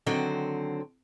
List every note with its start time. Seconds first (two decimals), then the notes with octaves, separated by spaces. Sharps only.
0.06 D3 D#3 F#3 C4 C5